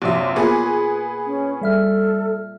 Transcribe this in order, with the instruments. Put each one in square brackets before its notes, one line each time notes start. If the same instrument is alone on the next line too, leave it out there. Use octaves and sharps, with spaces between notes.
[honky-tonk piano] A#1 F#2 E5 [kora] C3
[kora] A#2 [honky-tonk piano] B3 G#4 B4
[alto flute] C#4
[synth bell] G3 E5 F6 [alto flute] A4